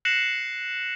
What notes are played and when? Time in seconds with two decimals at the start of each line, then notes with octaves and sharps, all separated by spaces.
0.05 F#6 A#6 C7 C#7 E7 F#7